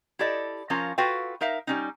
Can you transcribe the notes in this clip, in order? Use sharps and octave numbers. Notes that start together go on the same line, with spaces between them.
E4 G4 A4 D5 D#5
F3 C#4 F4 A#4 A#5
F4 F#4 A4 B4 F5 G5
D#4 A#4 E5 F5
G3 C#4 D#4